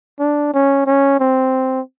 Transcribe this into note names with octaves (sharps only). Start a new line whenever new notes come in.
D4
C#4
C#4
C4